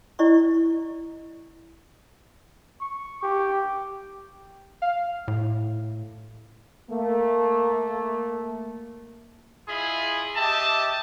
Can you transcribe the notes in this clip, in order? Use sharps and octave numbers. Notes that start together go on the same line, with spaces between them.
E4 D5 D#5 C#6
C#6
G4
F5
A2
A3 A#3
E4 F4 G#4 D#5 B5
G4 D#5 E5 A5